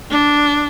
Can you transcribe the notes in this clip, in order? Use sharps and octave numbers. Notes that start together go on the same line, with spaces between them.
D4